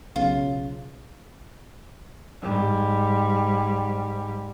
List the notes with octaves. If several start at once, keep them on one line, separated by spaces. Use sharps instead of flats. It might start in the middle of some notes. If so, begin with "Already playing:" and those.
B1 C#3 F4
G#2 G3